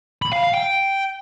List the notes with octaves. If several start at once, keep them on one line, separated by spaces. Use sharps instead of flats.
B5
F5
F5
G5